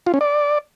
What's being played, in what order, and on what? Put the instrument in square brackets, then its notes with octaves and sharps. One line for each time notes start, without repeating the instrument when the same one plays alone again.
[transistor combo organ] F4
C#4
D5